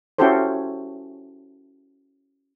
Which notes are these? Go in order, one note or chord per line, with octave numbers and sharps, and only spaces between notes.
C#4 E4 F#4 G4 A4 C5